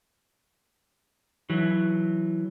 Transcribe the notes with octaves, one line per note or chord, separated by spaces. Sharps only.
E3 F#3